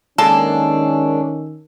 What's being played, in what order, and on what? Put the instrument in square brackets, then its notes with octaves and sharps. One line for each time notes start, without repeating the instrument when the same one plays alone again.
[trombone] D#3 [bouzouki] G#3 A#3 D4 [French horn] C#4 [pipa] A4